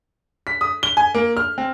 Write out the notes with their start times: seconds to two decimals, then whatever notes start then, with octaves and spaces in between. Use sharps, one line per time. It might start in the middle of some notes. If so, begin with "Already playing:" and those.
0.47 B6
0.61 D#6
0.83 G7
0.97 G#5
1.15 A#3
1.37 F6
1.58 C4